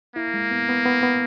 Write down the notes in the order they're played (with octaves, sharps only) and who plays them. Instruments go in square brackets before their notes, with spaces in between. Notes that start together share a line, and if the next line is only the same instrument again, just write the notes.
[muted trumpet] A#3 [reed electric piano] E4
[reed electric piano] G#3
B3
B3
B3
B3